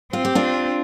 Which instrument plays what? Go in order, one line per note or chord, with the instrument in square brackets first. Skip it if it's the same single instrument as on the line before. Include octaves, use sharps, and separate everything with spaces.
[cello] C4 [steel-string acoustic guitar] F4
[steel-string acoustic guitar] G4
D4 F4